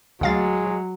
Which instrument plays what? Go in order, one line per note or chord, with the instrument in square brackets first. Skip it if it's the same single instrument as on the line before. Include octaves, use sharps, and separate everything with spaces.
[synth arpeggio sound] D2 F5 A6 [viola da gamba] F#3 [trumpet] G#3